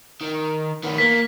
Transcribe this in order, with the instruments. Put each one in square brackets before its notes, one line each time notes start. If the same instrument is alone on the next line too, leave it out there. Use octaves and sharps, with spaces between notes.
[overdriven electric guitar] D#3
D#3 B3
[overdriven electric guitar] A#3 [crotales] B6